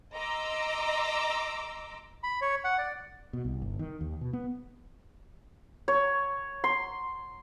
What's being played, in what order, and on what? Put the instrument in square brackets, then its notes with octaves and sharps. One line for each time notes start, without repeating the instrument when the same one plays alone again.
[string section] D#5 A#5 C6 D6 E6
[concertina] B5
C#5
F#5
D5
[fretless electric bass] B2
C2
G1
D#3
D#2
B2
B3
[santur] C#5
C6